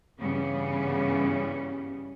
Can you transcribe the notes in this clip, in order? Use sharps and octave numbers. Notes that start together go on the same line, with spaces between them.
G2 C#3 E3 G3 B3 C#4